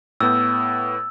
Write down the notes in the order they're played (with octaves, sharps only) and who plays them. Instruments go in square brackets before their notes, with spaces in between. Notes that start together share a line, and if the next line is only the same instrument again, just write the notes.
[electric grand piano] A2 B3 G6 [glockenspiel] E6